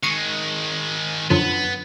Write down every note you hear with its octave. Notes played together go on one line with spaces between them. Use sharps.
D#3 G#3 C#6 C7 D#7
F#2 D3 F3 B3